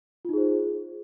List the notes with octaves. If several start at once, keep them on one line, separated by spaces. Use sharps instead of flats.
D#4 F4 G#4 C5